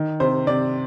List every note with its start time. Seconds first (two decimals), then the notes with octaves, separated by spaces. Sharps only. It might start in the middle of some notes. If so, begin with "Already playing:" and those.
Already playing: D#3
0.20 C3 C5
0.47 C3 D5